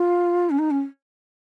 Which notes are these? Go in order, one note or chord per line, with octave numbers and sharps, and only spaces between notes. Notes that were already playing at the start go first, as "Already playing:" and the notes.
Already playing: F4
C#4
D#4
C#4